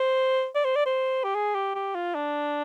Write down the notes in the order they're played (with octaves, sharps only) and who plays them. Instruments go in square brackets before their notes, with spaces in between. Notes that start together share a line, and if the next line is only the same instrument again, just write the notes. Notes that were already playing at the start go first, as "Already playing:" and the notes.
Already playing: [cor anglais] C5
D5
C5
D5
C5
G4
G#4
G4
G4
F4
D4